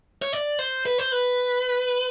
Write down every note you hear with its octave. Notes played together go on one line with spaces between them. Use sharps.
C#5
D5
C5
B4
C5
B4